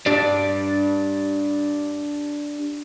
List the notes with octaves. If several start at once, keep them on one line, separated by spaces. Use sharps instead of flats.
D4 G4 D5